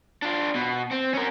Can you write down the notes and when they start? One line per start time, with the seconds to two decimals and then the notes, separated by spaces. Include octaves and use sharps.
0.22 D4 F4
0.55 B2
0.92 C4
1.14 C#4 A#4